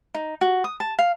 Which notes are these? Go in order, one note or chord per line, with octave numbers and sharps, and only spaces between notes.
D#4
F#4
D#6
A5
F5